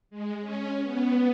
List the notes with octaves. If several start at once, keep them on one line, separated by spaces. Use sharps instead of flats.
G#3
C#4
B3